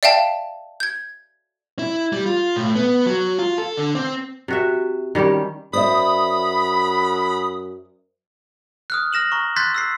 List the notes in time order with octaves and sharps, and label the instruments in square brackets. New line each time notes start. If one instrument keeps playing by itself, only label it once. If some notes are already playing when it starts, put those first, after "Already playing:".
[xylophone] D5 E5 F5 G5 A5
G6 G#6
[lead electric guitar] E4
G3
F4
A2
B3
F#3
F4
A4
D3
C4
[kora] C3 F#4 E5
D#3 G3 C#4 G4
[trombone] F#2 [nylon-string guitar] C5 D5 E5 [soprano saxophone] B5 [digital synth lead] D#6
[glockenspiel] D#6 F6 F#6
F6 A#6 E7 F#7
A#5 C#6
C6 F#6 G6 A6 B6
E6 B6 C7